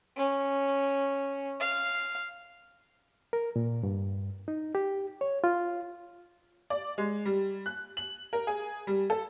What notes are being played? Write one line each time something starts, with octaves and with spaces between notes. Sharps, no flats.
C#4
F5
A#4
A#2
G2
D#4
G4
C#5
F4
D5
G#3
G3
F#6
F#7
A#4
G#4
G3
A4